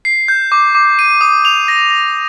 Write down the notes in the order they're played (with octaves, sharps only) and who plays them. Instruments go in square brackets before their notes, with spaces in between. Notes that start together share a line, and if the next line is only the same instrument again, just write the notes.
[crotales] C7
G6
D6
D6
D#7
D#6
F7
A#6
A#6